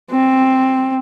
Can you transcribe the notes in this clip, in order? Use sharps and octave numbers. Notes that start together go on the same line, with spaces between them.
C4